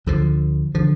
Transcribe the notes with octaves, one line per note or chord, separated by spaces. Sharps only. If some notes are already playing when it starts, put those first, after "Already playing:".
D2 D3 F3
D3 F3